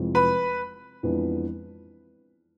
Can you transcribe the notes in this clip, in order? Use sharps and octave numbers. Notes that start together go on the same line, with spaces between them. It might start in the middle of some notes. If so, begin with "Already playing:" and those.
Already playing: F1 F2 E3 G#3
B4 B5
F2 E3 G#3 B3 D4